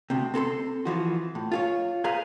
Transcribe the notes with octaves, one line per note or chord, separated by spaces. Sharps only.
D2 C3
C4 A4 A#5 C6
E3 F3 F#4
A2
F4 G#4 C#5
G#4 B4 C5 F5 A#5